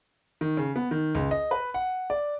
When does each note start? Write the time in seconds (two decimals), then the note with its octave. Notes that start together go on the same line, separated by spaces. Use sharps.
0.41 D#3
0.57 C#3
0.76 B3
0.91 D#3
1.15 C#2
1.31 D#5
1.51 B4
1.74 F#5
2.10 D5